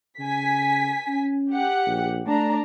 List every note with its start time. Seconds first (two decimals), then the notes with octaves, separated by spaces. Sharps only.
0.19 C#3 G#5 B6
1.08 C#4
1.51 G4 F#5
1.87 A#1
2.27 A3 D4 A#5